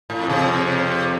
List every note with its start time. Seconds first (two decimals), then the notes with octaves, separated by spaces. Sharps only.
0.10 A2
0.20 F2
0.30 C3